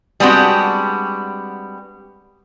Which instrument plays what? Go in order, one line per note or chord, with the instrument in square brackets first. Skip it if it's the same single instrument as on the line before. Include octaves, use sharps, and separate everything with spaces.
[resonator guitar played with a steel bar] G3 G#3 B3 C4 D4 F#4